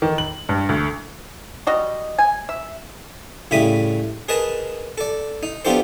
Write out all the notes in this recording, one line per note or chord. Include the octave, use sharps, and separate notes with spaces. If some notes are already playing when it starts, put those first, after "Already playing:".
D#3
F#7
G2
D2
G3 F#4 D#5
G#5
E5
A2 C#3 G3 E5 B5 D#6
G#4 A#4 B4 D#5 A5
A4 D5
D#4
B3 D4 F4 G4 A4 C5